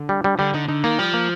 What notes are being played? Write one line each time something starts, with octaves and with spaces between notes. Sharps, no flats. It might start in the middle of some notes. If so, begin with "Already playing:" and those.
Already playing: D3
G3
G3
D3 G3
D3 D#4
D3 D#4
D#3 A#3
F3 G3
A#3